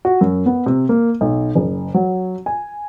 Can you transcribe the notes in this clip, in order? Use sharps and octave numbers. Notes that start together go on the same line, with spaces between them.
F#4
F#2
B3
C3
A#3
B1
F#1
F#3
G#5